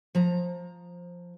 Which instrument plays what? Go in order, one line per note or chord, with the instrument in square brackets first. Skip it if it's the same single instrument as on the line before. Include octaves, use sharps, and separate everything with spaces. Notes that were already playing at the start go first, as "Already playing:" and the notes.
[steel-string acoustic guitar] F3 A#5